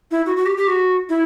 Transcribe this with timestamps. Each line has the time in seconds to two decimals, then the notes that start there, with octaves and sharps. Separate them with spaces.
0.11 E4
0.26 F#4
0.37 F#4
0.46 G4
0.57 G4
0.68 F#4
1.09 E4